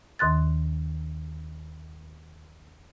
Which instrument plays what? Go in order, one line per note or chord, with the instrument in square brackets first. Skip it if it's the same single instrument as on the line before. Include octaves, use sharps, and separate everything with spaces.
[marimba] D#2 D#3 C6 F#6 A6